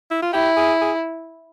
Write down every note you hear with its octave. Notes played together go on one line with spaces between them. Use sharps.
E4
F4
E4 G4
G#4
G#4